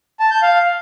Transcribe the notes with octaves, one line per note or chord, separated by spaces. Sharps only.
A5
G6
F5